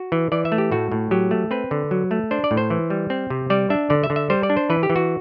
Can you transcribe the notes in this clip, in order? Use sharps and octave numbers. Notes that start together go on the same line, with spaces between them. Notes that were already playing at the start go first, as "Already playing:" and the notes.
Already playing: F#4
E3
E3 D5
E5
A3
G4
A2 F#4
A2
F#3 G4
A3
C4 B4
D3
F#3
A3
D4 C5
D5
A2
C5
E3
G3
C4
C3
G3 D5
D4 E5
D3 D5
E5
D3
E5
G3 C5
D5
D4
C5
E3 B4
G4
E3
F#4